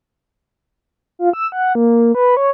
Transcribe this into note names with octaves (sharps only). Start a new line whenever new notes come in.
F4
E6
F#5
A#3
B4
C#5